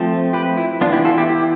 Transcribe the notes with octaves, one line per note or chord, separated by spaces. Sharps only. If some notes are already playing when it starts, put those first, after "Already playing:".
Already playing: F3 A3 C4
G4 B4
E4
E3 B3 D4 F4
E4 G4
F4 A4
E4 G4
E4 G4